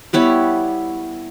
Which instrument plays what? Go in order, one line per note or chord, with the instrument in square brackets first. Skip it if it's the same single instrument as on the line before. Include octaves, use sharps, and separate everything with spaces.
[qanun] G3 B3 E4 C#5